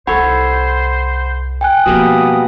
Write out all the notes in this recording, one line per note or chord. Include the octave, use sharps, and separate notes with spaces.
C2 F4 A4 C5 C#5 F#5 B5
G5 G#5 F#6
B2 F3 G3 A#3 C4 D#6